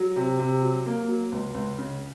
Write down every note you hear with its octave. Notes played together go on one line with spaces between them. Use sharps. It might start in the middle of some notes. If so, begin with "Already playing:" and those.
Already playing: F#3
C3
C3
F#3
A#3
F#3
C#2
C#2
C#3